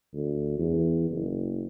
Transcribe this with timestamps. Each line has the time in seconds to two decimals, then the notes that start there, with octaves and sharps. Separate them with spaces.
0.14 D2
0.58 E2
1.10 F#1